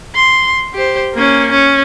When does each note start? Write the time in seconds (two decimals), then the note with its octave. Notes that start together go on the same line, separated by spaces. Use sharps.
0.15 C6
0.74 G4 C5
1.14 A#3 C#4
1.51 C#4